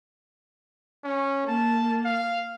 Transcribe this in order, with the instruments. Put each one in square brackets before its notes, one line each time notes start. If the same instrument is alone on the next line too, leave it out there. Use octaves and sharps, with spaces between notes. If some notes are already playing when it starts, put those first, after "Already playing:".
[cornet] C#4
[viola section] A#3 [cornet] A5
[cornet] F5